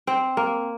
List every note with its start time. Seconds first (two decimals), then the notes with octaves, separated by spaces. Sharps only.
0.07 C4
0.37 A#3